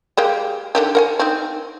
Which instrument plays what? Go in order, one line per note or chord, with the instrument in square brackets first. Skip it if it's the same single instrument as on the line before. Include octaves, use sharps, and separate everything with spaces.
[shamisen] G#3 A#3 G4
D3 D#3 G4
A#4 F#5 G#5
C4 D#4